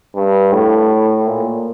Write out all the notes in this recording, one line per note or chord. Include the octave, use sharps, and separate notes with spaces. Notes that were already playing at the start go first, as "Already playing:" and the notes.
G2
A2
A#2